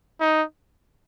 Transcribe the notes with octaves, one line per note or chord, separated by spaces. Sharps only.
D#4